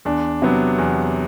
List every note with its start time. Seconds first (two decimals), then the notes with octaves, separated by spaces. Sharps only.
0.05 E2 D4
0.42 C3 F#3 B3
0.78 E2